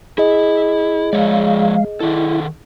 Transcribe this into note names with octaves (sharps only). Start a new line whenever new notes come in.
E4 G#4 D#5
F3 G#3 C#5 D5 F5
D#3 E4 A4